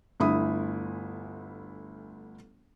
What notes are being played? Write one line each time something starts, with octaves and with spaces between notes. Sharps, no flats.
G1 D2 E4 B5 D#6